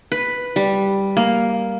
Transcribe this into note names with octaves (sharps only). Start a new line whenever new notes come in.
B4
G3
A#3